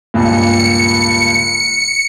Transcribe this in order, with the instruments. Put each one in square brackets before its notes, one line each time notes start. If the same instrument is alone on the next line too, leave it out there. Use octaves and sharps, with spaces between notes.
[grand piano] C#2 G2 A#2 [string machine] C#7